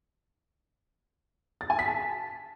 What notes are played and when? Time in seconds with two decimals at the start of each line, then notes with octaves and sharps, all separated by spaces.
1.61 A6
1.70 G#5
1.79 B6
1.88 A5